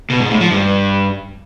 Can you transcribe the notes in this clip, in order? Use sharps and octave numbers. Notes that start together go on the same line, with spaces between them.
B2
G#2
A2
F3
G2